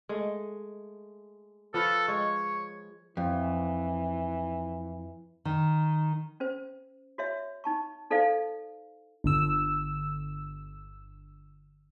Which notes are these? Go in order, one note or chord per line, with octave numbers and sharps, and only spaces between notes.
G#3 A3
F3 A4 B4 C#5
G#3 C#5
F2 E3
D#3
C#4 C5
F#4 C#5 E5
D#4 A5 C#6
D#4 A4 C5 D5 F5
G1 D3 E6